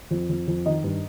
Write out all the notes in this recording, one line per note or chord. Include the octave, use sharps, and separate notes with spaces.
F2
F2
F2
D#3 D#5
G2